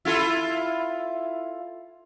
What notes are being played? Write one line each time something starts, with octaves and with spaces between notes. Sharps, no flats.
E4 F4 A4